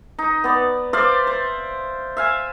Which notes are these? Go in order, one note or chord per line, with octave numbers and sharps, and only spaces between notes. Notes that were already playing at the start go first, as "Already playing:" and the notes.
D#4
B3 D5
C5 D5 E5 F5
C5
E5 F5 G#5